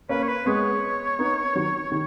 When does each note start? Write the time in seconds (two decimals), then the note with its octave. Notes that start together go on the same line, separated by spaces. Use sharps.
0.09 A#3 C#4 B4
0.23 C#5
0.28 B4
0.46 G#3 B3 C#5
1.19 B3 D#4
1.55 D#3 F#3
1.92 D#3 C#5